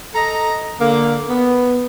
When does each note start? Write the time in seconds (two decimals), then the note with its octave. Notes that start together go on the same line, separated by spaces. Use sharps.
0.15 A4 D#5 A#5
0.81 D3 A#3
1.29 B3